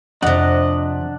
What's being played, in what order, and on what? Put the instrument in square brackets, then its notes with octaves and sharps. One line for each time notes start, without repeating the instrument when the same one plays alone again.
[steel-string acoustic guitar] F2 C3 [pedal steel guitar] D4 F#5 [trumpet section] D#5